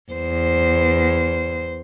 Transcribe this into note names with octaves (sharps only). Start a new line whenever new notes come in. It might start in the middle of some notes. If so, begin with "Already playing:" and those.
E2 C5